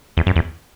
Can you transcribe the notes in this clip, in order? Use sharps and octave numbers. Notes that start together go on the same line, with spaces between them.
E2
F#2
E2